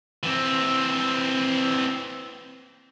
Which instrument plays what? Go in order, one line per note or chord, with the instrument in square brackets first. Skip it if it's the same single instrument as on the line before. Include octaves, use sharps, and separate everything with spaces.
[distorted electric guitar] E3 C4